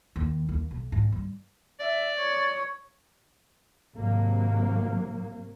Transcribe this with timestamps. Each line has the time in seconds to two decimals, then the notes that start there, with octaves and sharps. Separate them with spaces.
0.16 D#2
0.49 D#2
0.71 B1
0.92 G#2
1.12 G2
1.80 D5 E5
2.17 C#5
3.96 G#1 C3 F#3 A#3